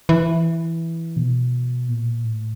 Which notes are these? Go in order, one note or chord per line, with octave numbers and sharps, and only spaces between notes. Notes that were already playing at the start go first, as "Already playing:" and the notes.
E3
B2
A#2
A2